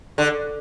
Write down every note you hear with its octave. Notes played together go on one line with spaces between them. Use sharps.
D3